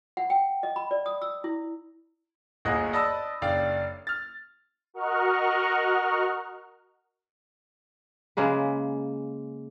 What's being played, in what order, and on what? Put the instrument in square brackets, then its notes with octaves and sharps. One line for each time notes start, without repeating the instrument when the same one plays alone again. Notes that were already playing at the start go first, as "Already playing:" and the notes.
[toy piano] F#5
G5
D#5
B5
D5
D#6
E6
E4
[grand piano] G1 D2 A#3 G#4 D#5 F#6
D5 D#5 A5 B5 D#6 E6
F#1 D4 D5 F5 G5
F6 A6
[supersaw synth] F#4 A#4 D#5 F#5 C#6 F6
[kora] C#3 G#3 A#3 B4